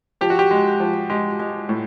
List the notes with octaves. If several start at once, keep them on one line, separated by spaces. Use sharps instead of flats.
F3 G4
F#4
G4
G#3
F3
G#3 G4
G#3
A2